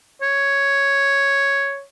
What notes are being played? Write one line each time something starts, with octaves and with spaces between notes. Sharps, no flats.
C#5